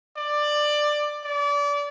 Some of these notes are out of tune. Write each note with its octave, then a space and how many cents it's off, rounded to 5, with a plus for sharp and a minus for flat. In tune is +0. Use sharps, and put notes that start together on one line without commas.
D5 +15
D5 -30